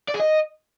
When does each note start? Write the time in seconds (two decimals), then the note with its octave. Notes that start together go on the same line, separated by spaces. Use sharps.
0.08 D5
0.14 G#4
0.20 D#5